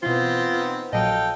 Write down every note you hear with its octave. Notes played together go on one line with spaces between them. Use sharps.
B2 E3 B3 C4 F4
D#4
A#1 A#2 F#3 A4 D#5 F5 G5